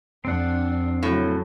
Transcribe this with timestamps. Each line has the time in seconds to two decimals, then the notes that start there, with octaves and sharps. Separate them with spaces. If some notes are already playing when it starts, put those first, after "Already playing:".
0.25 F2 C4 D4 F#5
1.03 A2 C#3 F#3